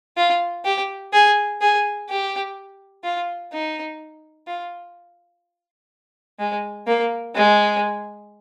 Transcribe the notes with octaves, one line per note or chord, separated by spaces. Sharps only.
F4
G4
G#4
G#4
G4
F4
D#4
F4
G#3
A#3
G#3